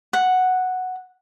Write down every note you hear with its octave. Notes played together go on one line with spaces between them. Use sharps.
F#5